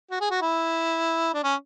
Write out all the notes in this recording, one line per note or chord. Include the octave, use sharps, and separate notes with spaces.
F#4
G#4
F#4
E4
D4
C#4